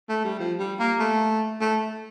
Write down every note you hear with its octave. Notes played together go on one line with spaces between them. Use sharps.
A3
G3
F3
G3
A#3
A3
A3